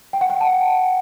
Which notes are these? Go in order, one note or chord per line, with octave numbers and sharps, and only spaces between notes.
G5
F#5
G5
A5